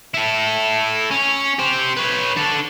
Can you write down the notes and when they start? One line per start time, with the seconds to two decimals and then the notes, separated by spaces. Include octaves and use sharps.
0.14 E4 A4
1.11 C#4
1.59 G4 C5
1.97 B4 C#5
2.37 D4 A4